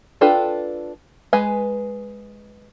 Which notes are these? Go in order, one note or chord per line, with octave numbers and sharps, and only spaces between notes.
D4 F4 A4 B4 G5
G#3 B4 G#5